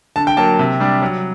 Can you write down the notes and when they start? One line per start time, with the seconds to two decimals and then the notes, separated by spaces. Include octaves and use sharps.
0.16 D3 A5
0.27 G5
0.37 F#3 A#3 A5
0.59 C3
0.80 G3 D4
1.02 F#3